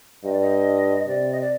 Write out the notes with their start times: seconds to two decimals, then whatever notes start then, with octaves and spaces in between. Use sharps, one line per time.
0.24 G2 D#5
0.32 D5
0.40 D#5
1.07 C3 D5
1.32 D#5
1.41 D5